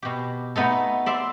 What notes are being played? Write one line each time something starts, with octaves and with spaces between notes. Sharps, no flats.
B2 G4
A3 B3 D#4 A4
D5 E5 C6